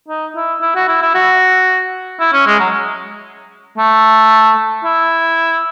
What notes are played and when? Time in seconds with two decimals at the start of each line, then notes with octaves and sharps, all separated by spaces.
0.09 D#4
0.36 E4
0.62 E4
0.76 F#4
0.88 E4
1.02 E4
1.15 F#4
2.20 E4
2.33 C#4
2.47 G#3
2.60 F#3
3.78 A3
4.84 E4